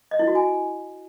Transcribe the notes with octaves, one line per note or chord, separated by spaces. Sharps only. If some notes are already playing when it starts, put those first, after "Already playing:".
D#5
E4
F#4
G#5